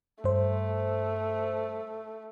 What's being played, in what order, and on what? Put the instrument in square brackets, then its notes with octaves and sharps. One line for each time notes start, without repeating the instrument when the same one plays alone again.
[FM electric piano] G2 C5 [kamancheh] A3